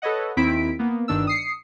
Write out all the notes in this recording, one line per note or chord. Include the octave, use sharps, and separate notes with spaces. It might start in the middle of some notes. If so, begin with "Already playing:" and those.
A4 B4 C#5 D#5 F#5
D#2 D#3 C4 E4 B6 D7
A#3 B3
G1 G2 D#3 D4 E6
D#6 C7 C#7